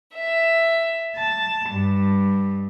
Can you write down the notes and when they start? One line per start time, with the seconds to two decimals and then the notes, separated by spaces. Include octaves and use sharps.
0.14 E5
1.15 A5
1.70 G2